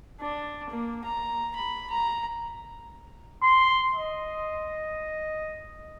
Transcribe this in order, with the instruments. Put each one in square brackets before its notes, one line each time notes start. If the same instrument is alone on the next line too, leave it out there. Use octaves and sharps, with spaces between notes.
[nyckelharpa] D4
A#3
A#5
B5
A#5
[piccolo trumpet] C6
D#5